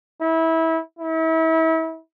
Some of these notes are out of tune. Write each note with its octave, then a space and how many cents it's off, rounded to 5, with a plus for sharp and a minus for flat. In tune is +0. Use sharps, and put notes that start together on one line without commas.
E4 -25
E4 -35